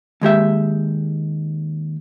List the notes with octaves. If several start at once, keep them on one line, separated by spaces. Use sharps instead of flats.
D#2 G#3 G4 E5